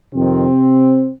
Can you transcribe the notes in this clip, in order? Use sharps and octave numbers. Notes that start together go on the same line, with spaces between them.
F2 C3 D#3 C4